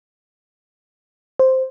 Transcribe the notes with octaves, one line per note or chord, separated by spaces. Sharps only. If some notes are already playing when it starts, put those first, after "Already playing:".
C5